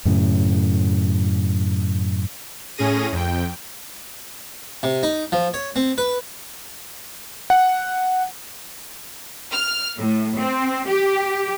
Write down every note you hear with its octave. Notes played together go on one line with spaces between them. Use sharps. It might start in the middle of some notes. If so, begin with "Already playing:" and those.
F#2 A2 C#3
A2 C#4 G#4 A#6 D#7
F2 G5
C3
D#4
F3
C#5
C4
B4
F#5
F6
A2
C4
G4